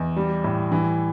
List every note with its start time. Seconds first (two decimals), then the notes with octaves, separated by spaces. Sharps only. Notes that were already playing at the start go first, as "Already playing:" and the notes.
Already playing: E2
0.16 G3
0.44 A2
0.72 E3